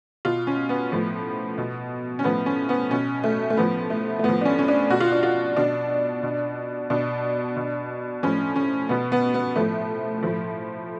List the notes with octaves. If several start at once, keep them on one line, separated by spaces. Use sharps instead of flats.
B2 F4
C#4
B3
A2 F3
B2
C#4
A2 F3 B3
C#4
B3
B2 C#4
A3
A3
A2 F3 B3
A3
A3
A2 F3 B3
D4
C#4
C#4
D4
B2 F#4
F4
D4
F4
B2 D4
B2
B2 D4
B2
A2 F3 C#4
C#4
B2 B3
B3
B3
A2 F3 A3
A2 F3